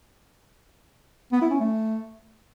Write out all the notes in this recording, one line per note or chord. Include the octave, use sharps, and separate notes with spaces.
B3
E4
C#4
A3